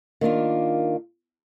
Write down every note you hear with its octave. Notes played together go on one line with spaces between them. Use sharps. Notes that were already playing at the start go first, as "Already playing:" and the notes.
D#3 A#3 D4 F4